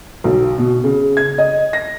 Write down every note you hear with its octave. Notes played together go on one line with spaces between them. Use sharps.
B1
B2
C#3
G#6
D#5
A#6